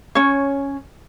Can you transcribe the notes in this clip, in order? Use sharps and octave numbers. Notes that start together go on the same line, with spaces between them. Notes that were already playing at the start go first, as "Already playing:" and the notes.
C#4 C#5